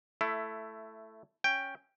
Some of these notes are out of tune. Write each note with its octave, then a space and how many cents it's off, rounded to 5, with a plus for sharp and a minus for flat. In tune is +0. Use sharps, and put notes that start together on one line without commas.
A3 +0 E4 +15
C#4 +0 G5 +5